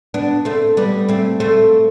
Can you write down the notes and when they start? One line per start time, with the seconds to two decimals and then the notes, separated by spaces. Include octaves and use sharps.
0.14 B3 D4
0.45 A3 C4
0.77 G3 B3
1.08 A3 C4
1.40 A3 C4